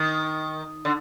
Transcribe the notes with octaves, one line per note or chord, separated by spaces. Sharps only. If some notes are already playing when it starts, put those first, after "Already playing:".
Already playing: D#3 D#6
D3